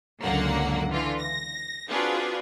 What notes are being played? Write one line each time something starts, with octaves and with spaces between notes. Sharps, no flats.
C#2 F#2 D3 A#3 F#5
D3 E3 F4
A#6
C4 D4 F4 F#4 G#4 B4